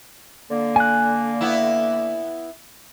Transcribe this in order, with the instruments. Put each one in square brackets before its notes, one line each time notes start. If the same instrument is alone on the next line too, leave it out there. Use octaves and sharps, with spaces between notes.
[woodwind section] D3 A#3
[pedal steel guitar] G#5 F#6
[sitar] B3 E4